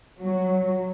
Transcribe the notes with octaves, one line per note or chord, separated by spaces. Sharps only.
F#3